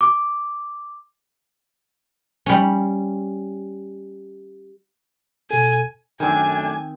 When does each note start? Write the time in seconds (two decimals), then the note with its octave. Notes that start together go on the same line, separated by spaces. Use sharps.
0.01 D6
2.46 G3 C#4
5.51 B2 A4 G#5
6.20 F#2 D#3 A3 C4 D4 G#5